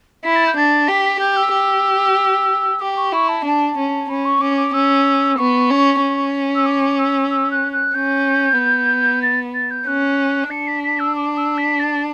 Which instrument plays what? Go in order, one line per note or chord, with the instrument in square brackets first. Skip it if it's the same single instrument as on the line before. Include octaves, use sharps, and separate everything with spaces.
[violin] E4 [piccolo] B6
[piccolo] A6
G6
[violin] D4 [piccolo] A6
[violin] G4 [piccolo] B6
[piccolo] B6
[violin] G4 [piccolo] G6
[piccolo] E6
[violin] G4
[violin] G4 [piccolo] D6
[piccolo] C#6
[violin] E4 [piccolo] C#6
[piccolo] A5
[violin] D4
C#4
[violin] C#4 [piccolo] B5
[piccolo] C#6
[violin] C#4 [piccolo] D6
[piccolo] D6
[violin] C#4 [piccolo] E6
[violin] B3 [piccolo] C#6
[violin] C#4
C#4
[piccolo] E6
D6
E6
E6
F#6
F#6
[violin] C#4 [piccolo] G6
[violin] B3
[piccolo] A6
A6
G6
[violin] C#4 [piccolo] F#6
[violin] D4 [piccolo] C#7
[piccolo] B6
B6
E6
D6
E6
B6
A6